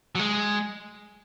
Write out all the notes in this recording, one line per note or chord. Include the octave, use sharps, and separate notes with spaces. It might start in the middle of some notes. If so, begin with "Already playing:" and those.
F#3
G#3